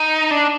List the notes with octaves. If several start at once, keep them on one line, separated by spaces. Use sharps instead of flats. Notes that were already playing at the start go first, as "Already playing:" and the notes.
Already playing: D#4
D4